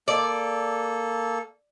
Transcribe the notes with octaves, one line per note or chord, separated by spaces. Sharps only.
A#3 A4 D5